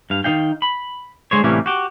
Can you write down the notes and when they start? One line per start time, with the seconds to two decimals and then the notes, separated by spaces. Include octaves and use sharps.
0.10 G2 F5
0.24 D#3 F3 D#4 F5 G5
0.62 B5
1.31 D3 G#3 C5 C#5
1.44 A2 C3 E3 G3 A#3 C#4
1.66 F#4 G4